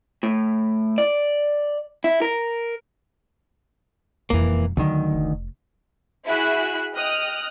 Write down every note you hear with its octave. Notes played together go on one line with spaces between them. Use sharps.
A2
D5
E4
A#4
E1 F2 E3 A#3
D2 D3 D#3 F#3
F1
E4 F#4 G#4 E5 F#6
D#5 G5 D#6 F6 F#6